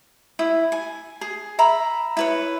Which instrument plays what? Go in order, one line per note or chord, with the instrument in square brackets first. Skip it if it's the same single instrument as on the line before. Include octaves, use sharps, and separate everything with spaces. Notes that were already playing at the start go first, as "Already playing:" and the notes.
[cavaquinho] E4
G#5
G#4
E5 A#5 B5
E4 B4 C#5